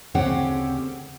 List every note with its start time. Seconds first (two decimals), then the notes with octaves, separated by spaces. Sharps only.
0.15 D2 C#3 C4 C#4 G4 F#5